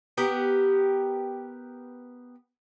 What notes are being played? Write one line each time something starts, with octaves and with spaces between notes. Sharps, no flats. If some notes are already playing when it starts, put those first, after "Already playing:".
B3 G4 A#4